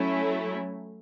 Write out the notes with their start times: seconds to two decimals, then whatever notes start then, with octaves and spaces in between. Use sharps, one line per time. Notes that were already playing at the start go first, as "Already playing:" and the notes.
Already playing: F#3 A3 C#4 E4